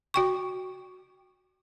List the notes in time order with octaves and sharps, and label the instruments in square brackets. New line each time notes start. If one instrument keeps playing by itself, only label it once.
[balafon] F#4 G5 C#6